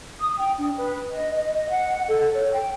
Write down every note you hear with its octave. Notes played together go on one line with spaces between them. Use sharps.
D#6
G5
D4
B4
D#5
D#5
D#5
F#5
A4
C#5
G5